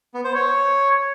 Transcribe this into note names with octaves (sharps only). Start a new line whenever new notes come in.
B3
C5
C#5